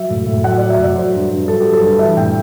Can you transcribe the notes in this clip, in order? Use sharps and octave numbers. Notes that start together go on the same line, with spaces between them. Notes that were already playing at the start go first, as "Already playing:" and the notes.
Already playing: F#3 E5
A2
A2
F#3 F#5
D5
F#3
E5
A2 D5
F#3 C5
G2
G2
F#3 A4
F#3 G4
A4
G2
E3 E5
A2 G5